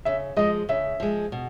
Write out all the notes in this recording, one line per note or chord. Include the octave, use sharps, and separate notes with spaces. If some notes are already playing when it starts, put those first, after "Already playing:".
C#3 E5
F3 G#3 D#5
C#3 E5
F3 G#3
B2